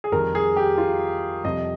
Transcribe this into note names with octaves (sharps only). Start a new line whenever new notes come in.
G#4
F2 D#3 G3 A#4
G#4
G4
F4
F2 C3 G3 D#5